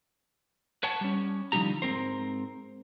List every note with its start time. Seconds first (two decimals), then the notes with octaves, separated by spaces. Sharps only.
0.83 B4 C#5 F#5 A5
1.01 G3 C#4
1.52 D3 F3 G3 D#4 G4 A#5
1.82 G#2 E3 C4 A#4 C5